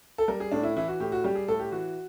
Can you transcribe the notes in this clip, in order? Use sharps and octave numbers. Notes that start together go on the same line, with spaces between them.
A4
G3 A#4
G#4
A2 D4
E4
E3 E4
F#4
A2 G4
F#4
G3 G4
G#4
A2 A4
G4
E3 F#4